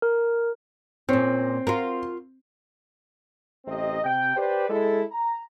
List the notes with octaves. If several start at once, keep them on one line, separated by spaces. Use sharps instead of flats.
A#4
A#2 C4 C#4
F4 F#4 A#4
A1 C3 C4 D#5
C3 G5
G4 B4 C5 D5
G#3 E4 A4
A#5